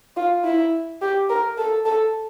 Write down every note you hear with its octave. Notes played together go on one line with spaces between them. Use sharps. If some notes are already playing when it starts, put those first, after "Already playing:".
F4
E4
G4
A#4
A4
A4